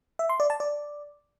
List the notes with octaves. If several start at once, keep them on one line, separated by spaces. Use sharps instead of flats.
E5
C6
D5
A5
D5